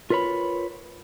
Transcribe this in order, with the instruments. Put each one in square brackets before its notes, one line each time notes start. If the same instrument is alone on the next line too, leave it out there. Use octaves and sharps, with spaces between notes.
[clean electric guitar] F4 A#4 B4 C#5 B5